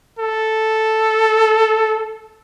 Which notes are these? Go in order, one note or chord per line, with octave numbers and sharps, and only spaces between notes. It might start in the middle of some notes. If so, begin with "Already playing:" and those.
A4